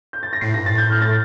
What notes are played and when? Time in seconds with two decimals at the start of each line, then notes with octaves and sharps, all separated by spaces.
0.13 G6
0.23 A6
0.33 A#6
0.41 A2 C7
0.54 G2 A#6
0.66 A2 A6
0.78 G6
0.90 F6
0.98 A#6
1.02 A6